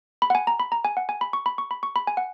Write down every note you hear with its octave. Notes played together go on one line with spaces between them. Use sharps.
B5
F#5
G#5
A#5
B5
A#5
G#5
F#5
G#5
B5
C#6
B5
C#6
B5
C#6
B5
G#5
F#5